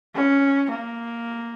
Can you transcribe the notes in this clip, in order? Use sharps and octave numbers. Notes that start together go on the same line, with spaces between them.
C#4
A#3